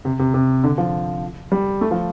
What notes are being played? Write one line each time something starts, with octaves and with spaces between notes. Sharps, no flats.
C3
C3
C3
D3
F3
G3
A3
F3